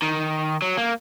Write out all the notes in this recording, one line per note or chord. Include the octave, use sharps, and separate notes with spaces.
D#3
F#3
A#3